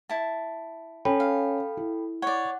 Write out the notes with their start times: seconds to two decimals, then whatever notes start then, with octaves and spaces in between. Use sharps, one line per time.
0.09 E4 A5
1.05 C#4 A4 G5 B5
1.20 F5
1.77 E4
2.22 C#5 D5 F#5